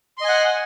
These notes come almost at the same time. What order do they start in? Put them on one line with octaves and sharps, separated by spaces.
C6 D#5 G#5 F#5